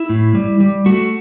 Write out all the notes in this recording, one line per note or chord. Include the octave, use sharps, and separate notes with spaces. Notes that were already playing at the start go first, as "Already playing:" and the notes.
Already playing: E4
A2
G3
G3
A3 F#4